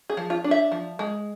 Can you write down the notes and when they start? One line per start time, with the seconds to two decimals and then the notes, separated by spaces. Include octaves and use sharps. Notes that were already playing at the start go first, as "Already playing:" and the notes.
0.10 G#4
0.17 F3
0.30 F4
0.44 D4
0.51 E5
0.72 F3
0.99 G#3